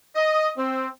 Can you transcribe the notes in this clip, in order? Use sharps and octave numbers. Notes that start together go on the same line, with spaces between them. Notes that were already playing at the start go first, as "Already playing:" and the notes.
D#5
C4